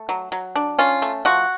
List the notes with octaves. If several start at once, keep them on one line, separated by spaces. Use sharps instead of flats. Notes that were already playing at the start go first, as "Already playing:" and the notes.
Already playing: A3
F#3
F#3
D4
C#4 F4
A3
F3 F#4